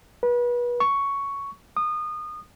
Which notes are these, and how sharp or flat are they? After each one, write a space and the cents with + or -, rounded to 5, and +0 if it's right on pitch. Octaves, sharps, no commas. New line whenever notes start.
B4 -30
C#6 +5
D#6 -25